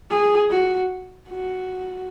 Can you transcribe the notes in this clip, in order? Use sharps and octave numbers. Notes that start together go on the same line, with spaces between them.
G#4
F#4
F#4